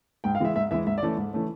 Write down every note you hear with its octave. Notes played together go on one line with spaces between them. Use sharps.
G#2 G5
F5
E3 G#3 E5
G#2 E5
E3 G#3 E5
G#2 E5
D5
E3 A3 C#4
G#2
E3 A3 C#4